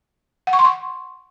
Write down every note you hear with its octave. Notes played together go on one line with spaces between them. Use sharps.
F#5
C#6
C6
C#6